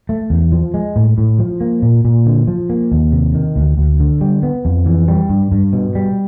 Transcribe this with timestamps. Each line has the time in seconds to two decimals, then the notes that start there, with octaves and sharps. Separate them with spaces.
0.09 A3
0.30 E2
0.52 F3
0.74 G#3
0.96 A2
1.18 A2
1.39 F3
1.61 A#3
1.82 A#2
2.05 A#2
2.26 D3
2.48 F3
2.70 A#3
2.92 D#2
3.12 C3
3.34 D#3
3.56 D2
3.78 D2
4.00 D3
4.21 G3
4.43 B3
4.65 F2
4.86 E3
5.08 G3
5.29 G2
5.52 G2
5.73 B2
5.95 G3